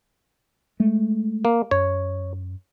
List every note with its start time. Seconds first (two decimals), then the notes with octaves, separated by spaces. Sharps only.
0.80 G#3 A3
1.45 A#3
1.71 F#2 C#5